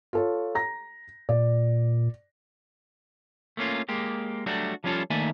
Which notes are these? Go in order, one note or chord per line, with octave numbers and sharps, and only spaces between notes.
F4 A4 C#5
A#5 A#6
A#2 D5
A3 A#3 C#4 F4
G#3 A#3 G4
F#3 G3 A3 D4 F#4
F3 G3 C#4 E4 F4 A4
D#3 A3 A#3 D5 E5 G#5